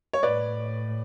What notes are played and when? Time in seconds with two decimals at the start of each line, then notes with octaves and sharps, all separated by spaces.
0.13 C#5
0.23 A2 B4 D5